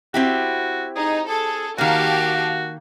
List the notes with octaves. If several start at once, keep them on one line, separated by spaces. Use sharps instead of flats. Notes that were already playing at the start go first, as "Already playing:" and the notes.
C4 E4 F#4 G4
D#4 G#4
G#4 A4
D#3 A#3 F#4 G4 F5 A5